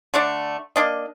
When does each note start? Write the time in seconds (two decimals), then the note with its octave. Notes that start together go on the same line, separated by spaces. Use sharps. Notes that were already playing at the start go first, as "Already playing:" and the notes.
0.14 D3 A3 D4 D5
0.76 A#3 D4 D#5